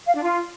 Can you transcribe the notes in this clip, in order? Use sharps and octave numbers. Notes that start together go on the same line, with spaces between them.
F5
D4
F4